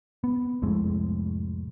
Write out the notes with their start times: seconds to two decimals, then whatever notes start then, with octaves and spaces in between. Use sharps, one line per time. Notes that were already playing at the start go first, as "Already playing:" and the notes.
0.24 B3
0.62 C2 F2 A2 G#3